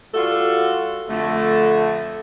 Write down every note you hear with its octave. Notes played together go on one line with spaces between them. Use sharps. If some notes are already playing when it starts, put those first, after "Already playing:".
G3 F4 F#4 A4
F2 D3 A3